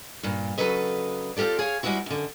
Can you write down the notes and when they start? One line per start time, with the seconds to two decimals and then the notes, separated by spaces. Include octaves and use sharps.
0.23 G2 A#2
0.58 C#3 F3 F#3 A4 B4 D#5
1.37 C4 F4 G4 A4 D5
1.59 G#4 C#5 F5
1.83 G3 G#3 C4 E4 F#4
2.06 F#2 D3